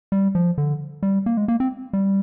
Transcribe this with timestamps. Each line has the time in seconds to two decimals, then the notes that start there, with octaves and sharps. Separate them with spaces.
0.12 G3
0.35 F3
0.58 D3
1.03 G3
1.26 A#3
1.37 G#3
1.48 A#3
1.60 C4
1.93 G3